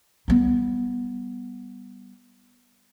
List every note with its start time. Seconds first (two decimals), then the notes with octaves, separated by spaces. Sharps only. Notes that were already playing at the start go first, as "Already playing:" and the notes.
0.28 G3 B3